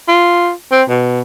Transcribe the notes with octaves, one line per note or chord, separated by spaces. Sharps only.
F4
C4
B2